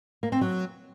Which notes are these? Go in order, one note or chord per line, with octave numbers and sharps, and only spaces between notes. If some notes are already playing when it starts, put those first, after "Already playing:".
A#3
C4
F#3